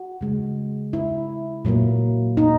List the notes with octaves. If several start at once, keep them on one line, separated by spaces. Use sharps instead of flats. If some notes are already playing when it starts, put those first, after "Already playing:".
Already playing: F#4
C#3 G#3
E4
A#2 F#3 A#3
D#4